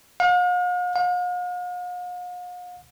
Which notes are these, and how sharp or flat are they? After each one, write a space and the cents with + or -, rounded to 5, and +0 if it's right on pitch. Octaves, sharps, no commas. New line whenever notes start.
F5 +45
F5 +45